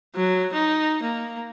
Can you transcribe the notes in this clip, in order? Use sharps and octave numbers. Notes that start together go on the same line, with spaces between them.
F#3
D#4
A#3